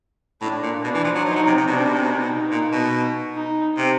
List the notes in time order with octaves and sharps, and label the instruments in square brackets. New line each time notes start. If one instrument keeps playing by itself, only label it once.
[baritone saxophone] A2 [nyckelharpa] D4
[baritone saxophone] A#2
[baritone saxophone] B2 [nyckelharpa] D4
[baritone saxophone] E3
F3
F#3
[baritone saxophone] F3 [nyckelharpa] D#4
[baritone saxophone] F#3
C3
C3
[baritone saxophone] B2 [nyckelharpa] D4
[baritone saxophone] C3
B2
C3
B2
[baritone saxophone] C3 [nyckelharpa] D#4
[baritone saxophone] B2
A#2
B2
[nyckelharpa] D#4
[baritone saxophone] C3